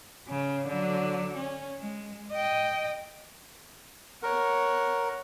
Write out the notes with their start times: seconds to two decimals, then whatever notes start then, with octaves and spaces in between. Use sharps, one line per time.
0.29 C#3
0.68 D3 F#3
1.36 C#4
1.79 G#3
2.33 D#5 G5
4.23 A#4 C#5 F#5